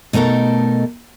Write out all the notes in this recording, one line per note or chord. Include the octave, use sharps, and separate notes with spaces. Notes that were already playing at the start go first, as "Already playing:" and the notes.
B2 A3 D#4 A4 A#4